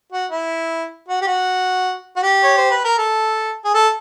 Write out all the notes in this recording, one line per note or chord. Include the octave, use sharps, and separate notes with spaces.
F#4
E4
F#4
G4
F#4
F#4
G4
C#5
C5
B4
A#4
A4
G#4
A4